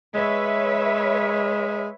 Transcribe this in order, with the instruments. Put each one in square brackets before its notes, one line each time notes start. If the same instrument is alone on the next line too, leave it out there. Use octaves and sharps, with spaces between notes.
[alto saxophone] G#3 [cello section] B4 C#5 E5